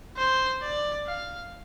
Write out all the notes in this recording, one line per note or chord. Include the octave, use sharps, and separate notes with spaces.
C5
D5
F5